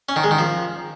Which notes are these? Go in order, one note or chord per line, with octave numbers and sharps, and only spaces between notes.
C#4
D#3
G#3
D#3
F3